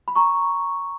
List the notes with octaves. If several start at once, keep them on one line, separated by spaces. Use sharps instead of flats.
B5
A#5 C#6